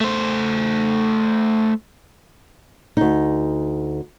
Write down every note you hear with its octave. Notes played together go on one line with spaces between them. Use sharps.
A3 C5
D2 D#4